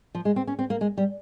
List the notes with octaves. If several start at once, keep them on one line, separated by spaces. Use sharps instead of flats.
F3
G#3
C4
C#4
C4
A#3
G#3
G3